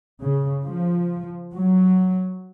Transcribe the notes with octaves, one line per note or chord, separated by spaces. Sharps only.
C#3
F3
F#3